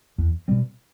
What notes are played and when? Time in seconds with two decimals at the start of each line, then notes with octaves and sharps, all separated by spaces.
0.18 E2
0.48 B2 G3 C4